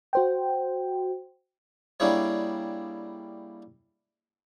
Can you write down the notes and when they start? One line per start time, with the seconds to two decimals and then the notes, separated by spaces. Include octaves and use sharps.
0.13 F#4 C5 G5
2.00 G3 A#3 D4 E4 G#4 C#5